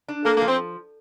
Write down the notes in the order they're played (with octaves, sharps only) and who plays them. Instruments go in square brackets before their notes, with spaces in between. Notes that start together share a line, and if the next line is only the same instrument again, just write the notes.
[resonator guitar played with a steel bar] D4
[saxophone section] A#3 [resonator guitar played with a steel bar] A4
[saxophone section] A#3
[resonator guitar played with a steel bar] F3
[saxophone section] C4